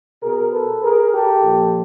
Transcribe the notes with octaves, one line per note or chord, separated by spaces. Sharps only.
B2 G#4 A#4
A4 B4
G#4 A#4
G4 A4
A#2 F3